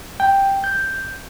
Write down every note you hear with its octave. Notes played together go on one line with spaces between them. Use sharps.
G5
G6